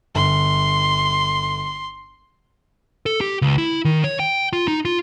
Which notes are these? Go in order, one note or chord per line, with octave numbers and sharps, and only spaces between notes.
G1 C6
A4
G4
C#2
E4
D#3
C#5
G5
F4
D#4
F4